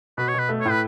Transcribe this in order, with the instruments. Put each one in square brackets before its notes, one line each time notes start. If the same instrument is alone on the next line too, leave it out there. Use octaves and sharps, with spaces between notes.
[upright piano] B2 [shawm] B4
[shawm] C#5
[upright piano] B2 [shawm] B4
[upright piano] A3
[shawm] C#5
[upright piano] A2 [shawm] B4